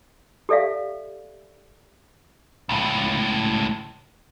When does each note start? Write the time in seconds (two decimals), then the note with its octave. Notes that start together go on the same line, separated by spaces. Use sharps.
0.49 G4 A4 D5 E5 F5
2.69 C#2 A2